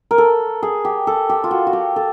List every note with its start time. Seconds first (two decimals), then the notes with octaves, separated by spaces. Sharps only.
0.11 A#4
0.18 A4
0.63 G#4
0.85 G4
1.07 A4
1.29 G4
1.44 F4
1.51 F#4
1.67 F#4
1.73 G4
1.96 A4